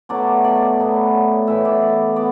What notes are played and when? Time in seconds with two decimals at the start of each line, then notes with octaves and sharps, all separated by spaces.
0.09 B2 F#3 A3 D5
0.44 D5
0.79 A2 F#3 B3
1.47 A2 E3 B3 E5
1.65 D5
1.81 D5
2.16 B3 D5